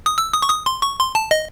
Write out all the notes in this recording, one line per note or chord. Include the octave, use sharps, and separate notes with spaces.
D#6
E6
D#6
C#6
D#6
C6
C#6
C6
A5
D#5